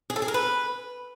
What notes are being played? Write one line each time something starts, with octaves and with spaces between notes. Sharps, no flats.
G#4
A4
G#4
A#4
B4